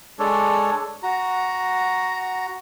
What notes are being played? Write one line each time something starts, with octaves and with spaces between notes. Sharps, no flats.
G#3 D4 A4 C#5
F#4 A#5